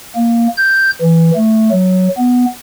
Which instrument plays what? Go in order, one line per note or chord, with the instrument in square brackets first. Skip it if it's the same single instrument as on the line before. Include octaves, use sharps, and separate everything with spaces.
[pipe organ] A#3
G6
E3
A3
F#3
B3